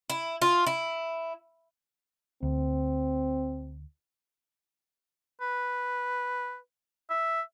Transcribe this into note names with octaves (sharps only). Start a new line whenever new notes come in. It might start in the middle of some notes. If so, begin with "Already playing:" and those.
E4
F4
E4
D2 C4
B4
E5